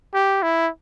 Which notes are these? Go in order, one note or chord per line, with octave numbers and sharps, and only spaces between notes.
G4
E4